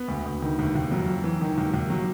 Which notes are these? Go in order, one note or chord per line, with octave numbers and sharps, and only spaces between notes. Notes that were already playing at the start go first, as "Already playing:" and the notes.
Already playing: B3
D2
D2
D#3
D#2
D#2
F2 F#3
F2
E3
D#3
D#2
D#2
F#3